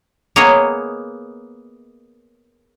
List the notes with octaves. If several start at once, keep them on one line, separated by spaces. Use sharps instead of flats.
A#3 B3 G#4 C#5 D#5